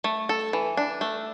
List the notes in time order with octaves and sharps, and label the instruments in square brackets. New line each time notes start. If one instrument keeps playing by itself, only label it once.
[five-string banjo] A3
A4
E3
D4
A3